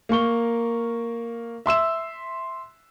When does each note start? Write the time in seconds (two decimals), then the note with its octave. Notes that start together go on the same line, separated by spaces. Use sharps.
0.09 A#3 A#4 C#6 G7
1.66 E5 C6 E6 E7